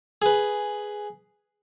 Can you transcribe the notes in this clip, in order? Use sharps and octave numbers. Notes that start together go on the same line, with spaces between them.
G#4 B4